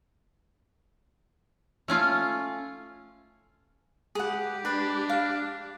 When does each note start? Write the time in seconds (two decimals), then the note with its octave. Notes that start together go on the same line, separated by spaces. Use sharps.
1.88 A3 C#4 F4 G#5
4.15 G#3 G4 G#4 B4 F#5
4.65 D4 B4
5.10 F5